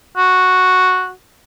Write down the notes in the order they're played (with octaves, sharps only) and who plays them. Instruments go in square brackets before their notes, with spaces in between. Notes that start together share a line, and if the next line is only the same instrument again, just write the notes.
[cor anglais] F#4